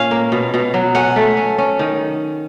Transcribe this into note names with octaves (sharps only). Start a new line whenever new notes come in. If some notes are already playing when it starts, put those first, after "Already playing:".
Already playing: A#2 C#4 C#5 F5
A#3
B2
B2
F#3
C#4 F#5
A3
C#4
C#4
D#3